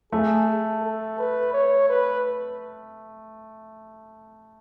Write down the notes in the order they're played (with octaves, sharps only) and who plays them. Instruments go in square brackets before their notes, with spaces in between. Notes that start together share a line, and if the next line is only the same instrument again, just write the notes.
[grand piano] A3 [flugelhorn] G#4
[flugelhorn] A4
A4
B4
C#5
B4